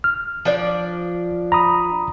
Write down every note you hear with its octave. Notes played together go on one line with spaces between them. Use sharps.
F6
F3 D4 D5
A#5 B5 D#6